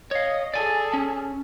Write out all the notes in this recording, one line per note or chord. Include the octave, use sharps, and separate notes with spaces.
C#5 D#5 F5
G#4 A4 D5 G#5
C#4